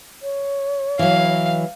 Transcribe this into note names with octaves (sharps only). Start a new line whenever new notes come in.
C#5
E3 F#3 F5